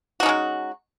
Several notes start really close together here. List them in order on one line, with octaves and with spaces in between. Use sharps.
F#4 D#4 C#4 G#3